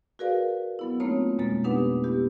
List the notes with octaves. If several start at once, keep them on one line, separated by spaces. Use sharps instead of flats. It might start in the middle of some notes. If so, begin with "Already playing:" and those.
F#4 G#4 A#4 B4 D5 F5
F#3 B3 E4
A3 A#3 C4 D#4 F4 C#5
F2 B2 G#3 A#3 A6
B3 D4 D#4 G4 B4 F#5
B3 E4 G4